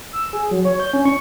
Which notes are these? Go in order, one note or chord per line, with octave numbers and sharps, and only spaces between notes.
E6
G#4
F#3
C#5
G6
C#4
C#6